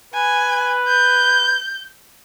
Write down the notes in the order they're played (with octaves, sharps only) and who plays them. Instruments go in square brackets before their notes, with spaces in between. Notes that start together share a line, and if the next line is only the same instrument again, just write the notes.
[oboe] B4 [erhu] G#5
[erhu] G6